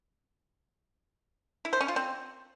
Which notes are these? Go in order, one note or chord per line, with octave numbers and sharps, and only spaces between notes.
E4
C5
C#4
F4
C4